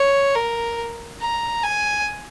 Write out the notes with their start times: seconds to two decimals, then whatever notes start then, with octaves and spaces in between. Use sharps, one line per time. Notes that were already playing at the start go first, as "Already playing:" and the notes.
Already playing: C#5
0.35 A#4
1.21 A#5
1.64 G#5